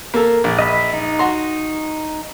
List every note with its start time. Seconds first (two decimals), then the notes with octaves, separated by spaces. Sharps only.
0.14 A#3 A4
0.44 A#1
0.59 D#5 E5 B5
0.94 D#4
1.19 F#4 A#5 C6